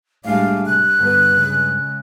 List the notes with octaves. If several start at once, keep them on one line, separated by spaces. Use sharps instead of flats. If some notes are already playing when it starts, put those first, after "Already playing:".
A2 G3 G#3 D4 F5
C3 F#6
G2 D3 B3 B4
C#3 G#3